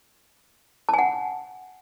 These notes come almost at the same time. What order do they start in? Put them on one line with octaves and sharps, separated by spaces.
A5 G#5 F#5